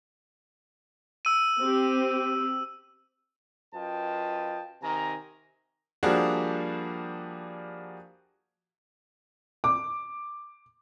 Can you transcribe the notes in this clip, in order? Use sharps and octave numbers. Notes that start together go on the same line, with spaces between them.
E6 D#7
C4 G4
F#2 F4 B4 D#5 G5 A5
C3 D#3 G#5 A#5
F3 G3 A#3 D4 F#4 G#4
D6